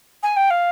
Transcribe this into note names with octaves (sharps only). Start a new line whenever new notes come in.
G#5
G5
F5